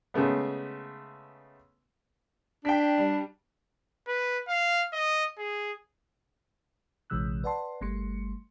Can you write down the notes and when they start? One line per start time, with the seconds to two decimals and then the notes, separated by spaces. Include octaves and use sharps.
0.14 C#3 G#3 A3 B3
2.65 D4 G5 B6
2.98 G3
4.07 B4
4.48 F5
4.93 D#5
5.38 G#4
7.10 A#1 C3 E3 G#3 E6 F#6
7.44 B4 D5 F#5 A5 C6
7.81 G1 G3 A3 C6 C#7